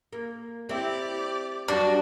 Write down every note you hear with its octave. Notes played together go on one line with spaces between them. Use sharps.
A#3
C4 E4 G4 D5
F#2 G3 D4 F#4